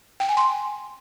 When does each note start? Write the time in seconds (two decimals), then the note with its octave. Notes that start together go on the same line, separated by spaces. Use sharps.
0.20 G5
0.29 G#5
0.37 C6